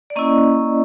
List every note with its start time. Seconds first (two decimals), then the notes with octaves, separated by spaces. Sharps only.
0.10 D5
0.16 A#3 C#4 E4 D#5